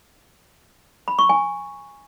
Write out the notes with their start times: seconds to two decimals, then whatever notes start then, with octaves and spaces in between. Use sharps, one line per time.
1.08 B5
1.19 C#6
1.29 G#5